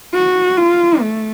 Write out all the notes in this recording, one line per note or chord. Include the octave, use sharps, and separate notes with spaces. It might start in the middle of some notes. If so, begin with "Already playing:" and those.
F#4
F4
A3